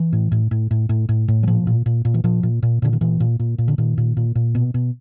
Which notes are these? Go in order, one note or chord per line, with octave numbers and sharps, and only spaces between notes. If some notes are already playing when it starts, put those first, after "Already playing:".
Already playing: E3
A2
A2
A2
A2
A2
A2
A2
F#3
A#2 F3
A#2
A#2
A#2
E3
A#2 F3
A#2
A#2
A#2 D3
D#3
A#2 E3
A#2
A#2
A#2
D3
A#2 D#3
A#2
A#2
A#2
B2
B2